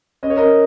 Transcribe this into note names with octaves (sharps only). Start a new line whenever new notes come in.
C#4 D#5
C#5
C#4 A#4 D#5